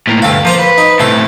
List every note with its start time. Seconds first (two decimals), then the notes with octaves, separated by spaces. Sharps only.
0.07 A2 A#3
0.22 D2 G2 A4 F5
0.45 F3 A#3 C5 A#5
0.59 B4
0.78 D#4
1.00 A2 C3 A3 A4